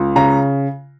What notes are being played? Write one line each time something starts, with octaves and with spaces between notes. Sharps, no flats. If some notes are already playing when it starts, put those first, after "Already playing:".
Already playing: C#2
C#3 A#5